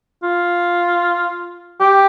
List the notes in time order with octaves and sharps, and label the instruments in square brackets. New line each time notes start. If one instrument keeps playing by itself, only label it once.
[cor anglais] F4
G4